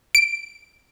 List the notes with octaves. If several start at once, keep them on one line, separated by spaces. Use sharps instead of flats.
D7